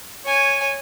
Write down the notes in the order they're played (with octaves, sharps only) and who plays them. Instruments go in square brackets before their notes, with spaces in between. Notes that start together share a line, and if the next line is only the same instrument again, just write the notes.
[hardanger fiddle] C#5 G#5